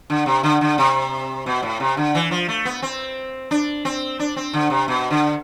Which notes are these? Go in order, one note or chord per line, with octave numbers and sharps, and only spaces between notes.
D3
C3
D3
D3
C3
B2
A2
C3
D3
E3
F3
A3
B3
C4
D4
C4
D4
C4
D3
C3
B2
D3